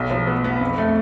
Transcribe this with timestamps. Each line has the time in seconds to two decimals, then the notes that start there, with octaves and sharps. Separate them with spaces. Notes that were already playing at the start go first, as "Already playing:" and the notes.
Already playing: B1
0.11 F3
0.27 B3
0.44 B3
0.61 F2
0.78 A3